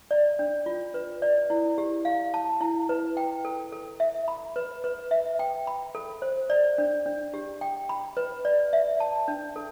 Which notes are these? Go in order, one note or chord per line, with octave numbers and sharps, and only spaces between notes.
D5
D4
F4
B4
D5
E4
G4
F5
A5
E4
B4
G5
A4
A4
E5
B5
B4
B4
E5
G5
B5
A4
C5
D5
D4
D4
G4
G5
B5
B4
D5
E5
A5
D4
A4